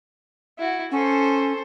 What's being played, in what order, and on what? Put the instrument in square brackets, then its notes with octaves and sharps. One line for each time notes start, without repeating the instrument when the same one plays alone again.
[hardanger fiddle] E4 F#4
[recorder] C#4 [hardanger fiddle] A4 C5